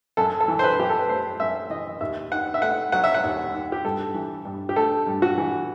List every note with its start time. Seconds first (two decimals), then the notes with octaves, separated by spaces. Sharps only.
0.17 F#2 A4
0.40 A4
0.48 E3
0.59 C5
0.64 B4
0.79 F#2 G4
0.89 A4
0.99 B4
1.09 A3 C5
1.40 F#2 E5
1.70 E3 D#5
2.01 D#2 E5
2.32 D#3 F#5
2.54 E5
2.62 A3 F#5
2.92 F#3 F#5
3.04 E5
3.14 F#5
3.23 D#2
3.54 D#3
3.72 G4
3.84 G2 A4
4.14 E3
4.45 G2
4.69 G4
4.76 A3 A4
5.07 G2
5.22 F#4
5.38 E3